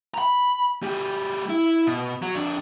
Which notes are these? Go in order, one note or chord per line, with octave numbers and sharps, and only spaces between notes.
A#5 B5
G#3 G4
E4
B2
F#3
F2 D4